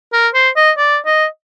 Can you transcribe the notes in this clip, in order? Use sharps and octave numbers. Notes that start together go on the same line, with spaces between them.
A#4
C5
D#5
D5
D#5